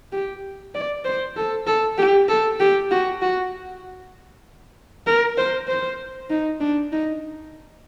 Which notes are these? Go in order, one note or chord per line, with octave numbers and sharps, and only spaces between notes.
G4
D5
C5
A4
A4
G4
A4
G4
F#4
F#4
A#4
C5
C5
D#4
D4
D#4